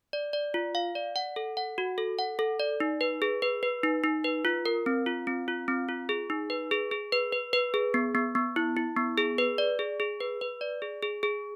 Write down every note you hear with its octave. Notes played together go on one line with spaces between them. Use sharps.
D5
D5
F4
F5
D5
F#5
A4
F#5
F#4
A4
F#5
A4
D5
D#4
B4
G#4
B4
B4
D#4
D#4
B4
F4
A#4
C4
F4
C4
F4
C4
F4
G#4
D#4
B4
G#4
G#4
B4
B4
B4
G#4
B3
B3
B3
E4
E4
B3
G#4
B4
D5
G#4
G#4
B4
B4
D5
G#4
G#4
G#4